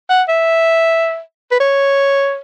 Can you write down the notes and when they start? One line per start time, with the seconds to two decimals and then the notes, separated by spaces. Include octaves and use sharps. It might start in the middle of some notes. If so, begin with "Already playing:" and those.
0.10 F#5
0.28 E5
1.51 B4
1.60 C#5